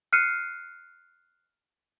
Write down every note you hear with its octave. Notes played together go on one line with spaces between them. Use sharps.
F6 F#6 C7 C#7 D#7